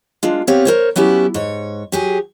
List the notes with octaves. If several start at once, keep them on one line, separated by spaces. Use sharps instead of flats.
G#3 D4 F4
B3 C4 G4 C#5 F5
A#4 C5 C#5
F#3 B3 C#4 E4 G4
G#2 C#5
F#3 G4 G#4